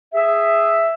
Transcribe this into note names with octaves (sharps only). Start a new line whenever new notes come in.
G#4 E5